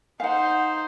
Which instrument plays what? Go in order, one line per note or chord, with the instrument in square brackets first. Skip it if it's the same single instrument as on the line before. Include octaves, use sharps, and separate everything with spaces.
[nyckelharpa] D#4 C5 [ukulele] F5 F#5